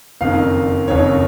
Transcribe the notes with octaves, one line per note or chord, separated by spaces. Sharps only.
F#1 F2 D#3 F5
F#1 F2 D#3 C#5